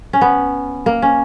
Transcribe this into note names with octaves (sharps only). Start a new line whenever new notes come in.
C#4
B3
A#3
C#4